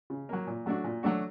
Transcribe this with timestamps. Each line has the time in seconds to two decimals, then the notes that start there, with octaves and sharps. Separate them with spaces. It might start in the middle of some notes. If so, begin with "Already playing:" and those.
0.10 C#3
0.29 F#3 A#3
0.47 A#2
0.66 F#3 A3 D4 F#4
0.84 A#2
1.03 F#3 A3 D4 F#4